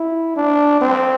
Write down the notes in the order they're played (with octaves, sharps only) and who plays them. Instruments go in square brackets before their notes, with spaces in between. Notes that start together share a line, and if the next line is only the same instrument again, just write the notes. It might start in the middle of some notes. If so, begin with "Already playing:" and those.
Already playing: [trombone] E4
D4
C4